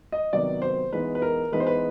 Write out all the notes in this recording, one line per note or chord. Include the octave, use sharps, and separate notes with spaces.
D#5
C3 D#3 F#3 B3 D#4 D5
C5
E3 G#3 B3 D#4 B4
B4
A#4
E3 G#3 B3 D#4 B4
C5
B4